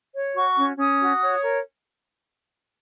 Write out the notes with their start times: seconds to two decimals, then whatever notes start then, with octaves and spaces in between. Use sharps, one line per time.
0.13 C#5
0.34 F#4 C#6
0.56 C#4
0.77 C#4 D#6
0.99 F#4
1.21 C#5
1.42 A#4